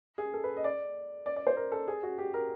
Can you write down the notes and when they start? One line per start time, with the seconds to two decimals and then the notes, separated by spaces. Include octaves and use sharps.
0.18 G#4
0.34 A4
0.44 B4
0.57 D#5
0.64 D5
1.26 D5
1.36 D5
1.47 C5
1.57 A#4
1.72 A4
1.88 G#4
2.03 F#4
2.18 G4
2.34 A#4